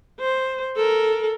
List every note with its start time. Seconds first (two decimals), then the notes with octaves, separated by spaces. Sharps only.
0.20 C5
0.76 A4 A#4